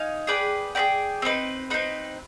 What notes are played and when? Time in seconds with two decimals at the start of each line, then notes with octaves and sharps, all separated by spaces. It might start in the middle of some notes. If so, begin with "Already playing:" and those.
Already playing: D#4 F5 G#5
0.27 G#4 B4 D5 G5
0.75 G#4 B4 D5 G5
1.22 C4 D#4 B4
1.70 C4 D#4 B4